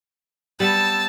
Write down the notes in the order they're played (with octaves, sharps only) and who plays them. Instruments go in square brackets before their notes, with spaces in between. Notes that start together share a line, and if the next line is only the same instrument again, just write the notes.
[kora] G3 B3 [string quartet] A5 E6 A6